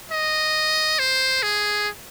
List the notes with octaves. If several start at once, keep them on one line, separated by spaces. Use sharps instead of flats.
D#5
C5
G#4